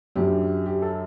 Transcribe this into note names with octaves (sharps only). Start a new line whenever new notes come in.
F#2 D3 F#3 G4
G4
A4